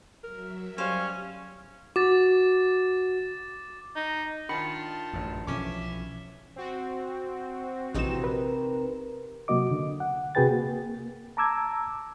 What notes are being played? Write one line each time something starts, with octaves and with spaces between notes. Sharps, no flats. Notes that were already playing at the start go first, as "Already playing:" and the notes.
F#3 A#4 E5
G3 C#4 C5 F5
F#4 D6 A6
D#4
D#3 D4 F4 A5 B5 C#7
A1 F#2
B1 E3 F3 C#4 E5 D6
C4 F#4
A#1 C3 E3 D#4 E7
A#4 B4
C3 F#3 A#3 F#4 D#5 D6
D3
F#5
C3 F#4 G#4 B4 G5 A6
A#3
A5 A#5 D6 E6 G#6